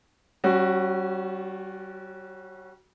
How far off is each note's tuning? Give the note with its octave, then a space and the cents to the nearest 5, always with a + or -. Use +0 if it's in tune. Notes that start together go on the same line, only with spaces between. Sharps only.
G3 -35 C#4 -20 F#4 +0